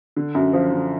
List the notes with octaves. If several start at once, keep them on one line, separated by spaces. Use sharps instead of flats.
D3
F#2
F3
D3